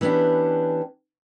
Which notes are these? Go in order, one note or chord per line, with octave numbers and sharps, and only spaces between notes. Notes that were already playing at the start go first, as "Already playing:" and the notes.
E3 B3 C#4 D4 G4